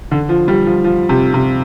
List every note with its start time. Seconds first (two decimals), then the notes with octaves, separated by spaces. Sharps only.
0.11 D3
0.29 F3
0.48 G3
0.67 F3
0.84 F3
1.09 C3
1.34 C3